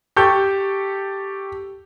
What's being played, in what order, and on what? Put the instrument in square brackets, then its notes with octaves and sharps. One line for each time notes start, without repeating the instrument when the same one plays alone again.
[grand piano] G4 A4 C#6 G6